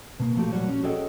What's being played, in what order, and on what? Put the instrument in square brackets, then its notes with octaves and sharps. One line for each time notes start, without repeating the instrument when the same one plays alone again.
[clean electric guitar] B2 A#3
F3 A3 F#4 G4
A#2 F#3 G3 F#4 C#5
C#4
F#4 G#4 A4 C#5 D#5 G5